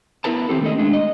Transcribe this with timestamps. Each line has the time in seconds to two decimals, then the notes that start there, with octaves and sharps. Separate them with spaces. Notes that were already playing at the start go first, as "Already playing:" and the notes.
0.24 B3 E4 A#4 B4 A5
0.49 D#3 C4 G4 A4
0.61 D#3 A3 C#4 A4 D#5
0.78 G#3 A3 D4
0.93 D#5